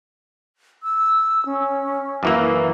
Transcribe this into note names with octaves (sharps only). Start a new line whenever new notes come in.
E6
C#4
F#2 E3 A#3